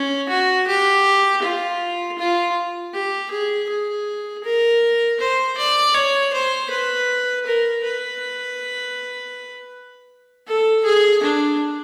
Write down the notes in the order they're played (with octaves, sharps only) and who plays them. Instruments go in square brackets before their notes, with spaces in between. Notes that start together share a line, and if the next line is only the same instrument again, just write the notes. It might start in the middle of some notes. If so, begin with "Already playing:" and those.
Already playing: [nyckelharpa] C#4
F#4
G4
F4
F4
G4
G#4
G#4
A#4
C5
D5
C#5
C5
B4
A#4
B4
A4
G#4
D4